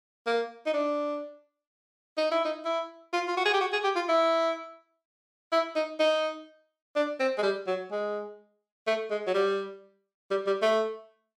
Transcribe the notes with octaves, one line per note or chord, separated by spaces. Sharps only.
A#3
D#4
D4
D#4
E4
D#4
E4
F4
F4
F#4
G#4
G4
F#4
G#4
G4
F4
E4
E4
D#4
D#4
D4
C4
G#3
G3
F#3
G#3
A3
G#3
F#3
G3
G3
G3
A3